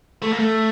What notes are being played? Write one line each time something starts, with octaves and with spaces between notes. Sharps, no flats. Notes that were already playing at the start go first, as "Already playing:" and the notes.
A3
A#3
A3